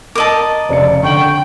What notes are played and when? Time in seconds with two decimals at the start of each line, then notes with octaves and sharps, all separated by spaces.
0.15 A#4 D#5 A5 D6 E6 F#7
0.69 F1 C#3 D5 C#7
1.03 D3 G5 C#6 F#7